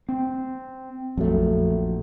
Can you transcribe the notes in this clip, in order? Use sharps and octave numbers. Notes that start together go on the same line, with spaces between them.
C4
A#1 F2 F#3 A3